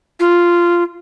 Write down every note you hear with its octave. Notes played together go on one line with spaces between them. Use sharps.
F4